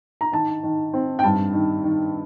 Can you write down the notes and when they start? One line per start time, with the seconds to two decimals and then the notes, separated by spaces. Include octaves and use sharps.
0.21 A#5
0.32 D#3 A5
0.63 D#3
0.94 C4
1.19 G5
1.24 G2 A5
1.53 D#3
1.84 D#3